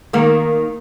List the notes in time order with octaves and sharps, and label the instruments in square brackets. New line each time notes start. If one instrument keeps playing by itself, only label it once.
[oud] D#3 A#3